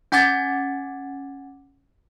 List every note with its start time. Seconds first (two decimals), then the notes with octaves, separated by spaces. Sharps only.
0.12 C#4 F#5 G#5 D6 G#6 A6